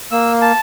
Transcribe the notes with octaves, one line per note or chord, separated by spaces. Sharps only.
A#3 E6
A5